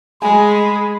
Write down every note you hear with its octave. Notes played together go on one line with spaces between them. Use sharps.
G#3 G#4 G#5 B5